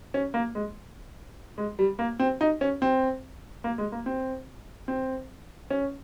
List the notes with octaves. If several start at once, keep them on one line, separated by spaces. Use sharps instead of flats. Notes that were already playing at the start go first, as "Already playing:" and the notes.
C#4
A#3
G#3
G#3
G3
A#3
C4
D#4
C#4
C4
A#3
G#3
A#3
C4
C4
C#4